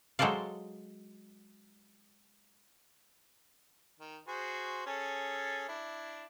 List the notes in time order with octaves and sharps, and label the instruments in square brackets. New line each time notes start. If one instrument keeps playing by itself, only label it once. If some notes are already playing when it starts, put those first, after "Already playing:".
[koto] F#3 G#3 A4 C5 D5 F5
[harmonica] D#3
F#4 G#4 C5
C#4 G#4 A4
D4 E4